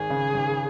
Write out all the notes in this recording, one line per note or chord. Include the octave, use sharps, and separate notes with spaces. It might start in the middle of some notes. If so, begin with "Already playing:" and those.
Already playing: G#1 G#4
C#3
G#1